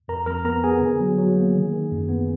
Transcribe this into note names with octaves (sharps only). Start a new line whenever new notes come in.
F2 A#4 A#5
F2 A#4 A#5
B3 A#4 A#5
B3 G#4 G#5
D3
F#3
F#3
A#3
D#3
D#3
F#2
B3